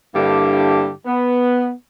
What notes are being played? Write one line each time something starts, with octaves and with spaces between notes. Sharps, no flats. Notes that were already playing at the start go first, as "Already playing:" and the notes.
G2 D3 A#3 D4 E4 G4
B3